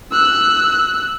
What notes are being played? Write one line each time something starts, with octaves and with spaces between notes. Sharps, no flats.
E6 F#6